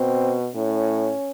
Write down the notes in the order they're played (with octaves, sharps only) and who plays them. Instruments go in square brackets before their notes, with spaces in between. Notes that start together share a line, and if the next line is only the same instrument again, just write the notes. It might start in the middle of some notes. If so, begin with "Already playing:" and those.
Already playing: [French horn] B2 [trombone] C4
[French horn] A2 [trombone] C#4